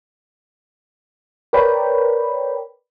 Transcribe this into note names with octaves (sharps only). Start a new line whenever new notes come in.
A#4 B4 C#5 D5 G5 B5